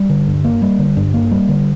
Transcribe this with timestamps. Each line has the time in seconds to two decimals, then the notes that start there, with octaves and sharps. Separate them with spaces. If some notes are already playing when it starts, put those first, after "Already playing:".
Already playing: G3
0.09 D3
0.27 G2
0.44 A#3
0.62 G3
0.79 D3
0.97 G2
1.14 A#3
1.31 G3
1.48 D3